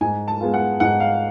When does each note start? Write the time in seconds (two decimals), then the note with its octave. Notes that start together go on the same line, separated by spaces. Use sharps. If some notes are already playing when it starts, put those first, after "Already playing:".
0.01 G#2 G#5
0.28 A5
0.41 G#3 B3 F4
0.54 F#5
0.80 G#2 F#5
1.00 F5